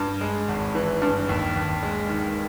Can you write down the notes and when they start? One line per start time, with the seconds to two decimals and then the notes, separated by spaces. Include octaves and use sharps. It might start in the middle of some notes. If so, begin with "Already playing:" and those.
Already playing: G2
0.21 G#3
0.48 G#1
0.75 E3
1.02 G2
1.29 D#2
1.56 D#2
1.83 G#3
2.09 D#3